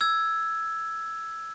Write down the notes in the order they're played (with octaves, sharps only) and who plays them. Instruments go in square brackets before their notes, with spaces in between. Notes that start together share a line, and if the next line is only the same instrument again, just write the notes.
[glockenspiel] E6 G#6